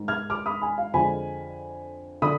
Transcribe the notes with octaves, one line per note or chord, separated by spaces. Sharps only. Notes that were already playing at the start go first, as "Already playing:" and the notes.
Already playing: G#2 D#3
F6 G#6
D6 F6
B5 D#6
G#5 B5
F5
F2 D3 G#3 G#5 B5
D3 B5 D#6